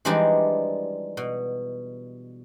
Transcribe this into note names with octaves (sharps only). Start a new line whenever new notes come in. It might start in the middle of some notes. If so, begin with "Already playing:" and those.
E3 F3 G3 G#3 D4 D#4
B2